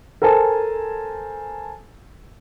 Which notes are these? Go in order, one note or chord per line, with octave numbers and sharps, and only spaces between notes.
A4 A#4 C5 G#5 A5